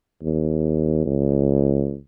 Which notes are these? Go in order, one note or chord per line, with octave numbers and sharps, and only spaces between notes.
D#2
C#2